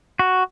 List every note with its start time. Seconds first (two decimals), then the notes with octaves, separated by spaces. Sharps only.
0.19 F#4